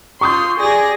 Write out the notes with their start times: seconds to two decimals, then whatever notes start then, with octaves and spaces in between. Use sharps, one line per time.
0.21 F4 C6 C#6 D#6 G6
0.59 G4 G#4 D5 G#5 A#6